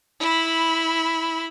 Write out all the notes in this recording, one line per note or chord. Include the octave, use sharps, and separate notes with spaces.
E4 B5